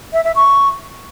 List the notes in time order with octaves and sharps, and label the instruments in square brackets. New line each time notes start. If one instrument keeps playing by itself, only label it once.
[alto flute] E5
E5
C#6